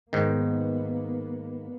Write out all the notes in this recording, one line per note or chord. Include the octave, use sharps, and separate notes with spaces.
G#2 D#3 A#3 B3